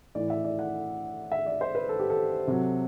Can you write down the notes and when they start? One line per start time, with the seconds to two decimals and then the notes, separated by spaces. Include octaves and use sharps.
0.15 A2 E3 D5
0.30 E5
0.44 D5
0.59 F#5
1.32 E5
1.46 D5
1.61 C5
1.75 B4
1.89 A4
2.00 G4
2.10 A4
2.47 C3 F#3